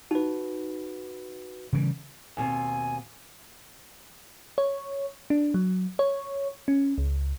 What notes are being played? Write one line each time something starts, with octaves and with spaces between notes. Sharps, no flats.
D#4 F#4 B4
C#3 E3 G3
D#2 B2 C4 G#5
C#5
D4
F#3
C#5
C#4
C#2